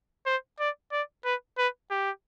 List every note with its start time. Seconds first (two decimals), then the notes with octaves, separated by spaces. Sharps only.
0.26 C5
0.60 D5
0.92 D5
1.25 B4
1.58 B4
1.91 G4